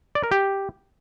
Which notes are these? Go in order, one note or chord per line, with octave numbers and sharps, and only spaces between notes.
D5
A#4
G4